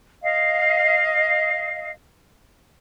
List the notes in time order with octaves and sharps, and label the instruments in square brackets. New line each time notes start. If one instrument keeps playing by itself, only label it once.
[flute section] D#5 F5